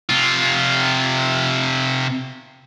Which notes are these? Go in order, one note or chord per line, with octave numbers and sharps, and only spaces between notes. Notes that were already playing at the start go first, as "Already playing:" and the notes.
C3 F4